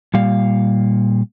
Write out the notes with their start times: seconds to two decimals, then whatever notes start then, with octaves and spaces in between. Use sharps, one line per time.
0.14 A#2 G3 F5